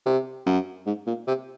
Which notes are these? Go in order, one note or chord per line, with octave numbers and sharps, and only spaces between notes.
C3
F#2
G#2
A#2
C3